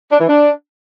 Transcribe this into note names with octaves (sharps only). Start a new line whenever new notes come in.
D4
E3
D4